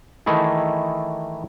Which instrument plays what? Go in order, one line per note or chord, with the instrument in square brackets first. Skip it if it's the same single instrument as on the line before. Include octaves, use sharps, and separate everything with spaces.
[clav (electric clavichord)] D#3 E3 A3 D#4 E4 G#4